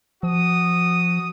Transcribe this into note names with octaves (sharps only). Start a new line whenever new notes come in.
F3 F#4 D#6